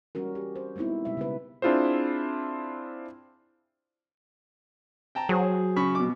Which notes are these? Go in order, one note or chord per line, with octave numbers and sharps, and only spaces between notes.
E3 G3 C#4 F#4 A#4
G4
C5
G#3 B3 C4 D#4 E4
B2 G3 G#3 E5
C#3 B3 B4
C4 D4 E4 F4 G#4 C5
G5 A5 A#5
F#3 G#4 C5
C#3 B5 C#6
B2 D6